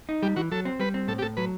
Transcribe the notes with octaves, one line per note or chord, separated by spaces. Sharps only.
D#4
G3 G4
E3 F#4
F#3 A4
C4
G3 B4
C4
A2 A4
G4
A2 A4
F#3 B4